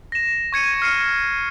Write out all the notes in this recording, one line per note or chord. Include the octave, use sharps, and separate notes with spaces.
A#6 E7
C#6 G#6 C#7 D#7
F6 C7 C#7 D#7